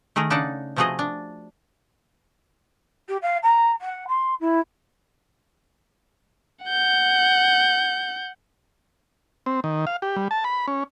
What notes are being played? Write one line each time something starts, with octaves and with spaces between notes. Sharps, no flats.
D#3 A3 G#4 A#4
C#3 D4 D#4 A4 D5 F#5
C3 F3 A3 F#4 G#4 D#5
D4
G4
F5
A#5
F#5
C6
E4
F#5 G6
C4
D#3
F5
G4
G3
A5
B5
C#4